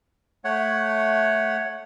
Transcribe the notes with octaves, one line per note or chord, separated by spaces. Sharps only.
A3 C#5 F#5